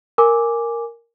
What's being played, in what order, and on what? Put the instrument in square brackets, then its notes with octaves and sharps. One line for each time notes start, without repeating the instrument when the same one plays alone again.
[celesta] A#4 G#5 D6